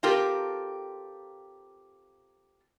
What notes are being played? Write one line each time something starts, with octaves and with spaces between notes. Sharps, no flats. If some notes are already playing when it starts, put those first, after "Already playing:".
C4 F4 G4 A4 A#4